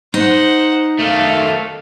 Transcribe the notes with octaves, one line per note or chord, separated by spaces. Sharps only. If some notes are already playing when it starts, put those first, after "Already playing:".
D#4 C5 F#5
D#3 A3 F5